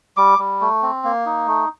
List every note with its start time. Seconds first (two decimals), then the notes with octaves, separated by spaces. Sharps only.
0.17 G3 D6
0.39 G3
0.61 A3
0.82 C4
1.04 A#3
1.26 D#4
1.47 A3